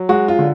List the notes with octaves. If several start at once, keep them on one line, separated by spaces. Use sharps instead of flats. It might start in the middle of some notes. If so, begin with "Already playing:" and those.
Already playing: F#3
G#3 F#4
F4
D3